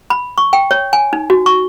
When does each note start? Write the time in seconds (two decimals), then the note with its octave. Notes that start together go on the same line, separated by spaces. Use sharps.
0.10 B5
0.38 C#6
0.53 G5
0.71 C#5
0.93 G#5
1.13 D#4
1.30 F#4
1.46 C#6